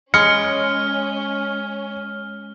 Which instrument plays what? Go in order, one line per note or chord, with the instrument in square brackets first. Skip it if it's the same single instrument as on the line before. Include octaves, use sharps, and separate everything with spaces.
[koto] G#3 [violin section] C#4 [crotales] F6 [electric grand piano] C#7